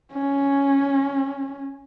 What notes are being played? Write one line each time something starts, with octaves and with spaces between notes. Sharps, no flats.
C#4